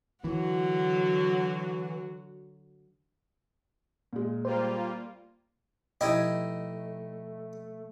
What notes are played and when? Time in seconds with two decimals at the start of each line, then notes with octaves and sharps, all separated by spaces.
0.24 D3 E3 F#3 F#4
4.13 A#2 G#3
4.45 G3 A#3 F4 C5
6.01 B2 F3 A3 D#4 E4 G4 D#5 G#6